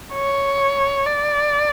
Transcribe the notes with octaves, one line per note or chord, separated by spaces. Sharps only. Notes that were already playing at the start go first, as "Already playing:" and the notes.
C#5
D5